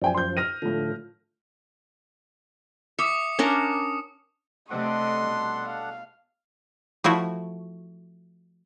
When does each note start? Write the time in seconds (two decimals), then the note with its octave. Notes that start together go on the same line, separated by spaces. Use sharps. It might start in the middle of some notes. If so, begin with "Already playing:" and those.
0.02 F#2 F3 D5 G5 G#5
0.14 C6 G6
0.37 F6 A#6 D#7
0.62 A2 D3 F3
2.99 E5 D6 D#6 C#7
3.39 C#4 D4 A#4
4.70 C3 A3 C4 D4 A4 D#5 F#5 C6
5.21 B2 G3
5.64 F5
7.04 F3 A3 E4 F#4